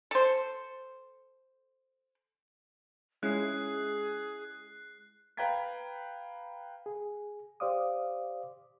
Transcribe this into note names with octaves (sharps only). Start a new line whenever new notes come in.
A4 C5
G#3 C#4 E4 G#4 F#6 C7
B4 F5 G5 A#5 G#6 B6
G#4
G4 C5 D5 F5 D6 D#6